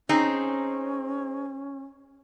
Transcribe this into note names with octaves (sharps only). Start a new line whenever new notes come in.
C4 C#4 D#4 G#4